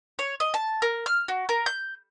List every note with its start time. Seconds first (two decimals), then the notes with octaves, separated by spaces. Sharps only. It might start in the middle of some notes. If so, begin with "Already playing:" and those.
0.19 C#5
0.40 D#5
0.54 A5
0.82 A#4
1.06 F6
1.28 F#4
1.49 A#4
1.66 G6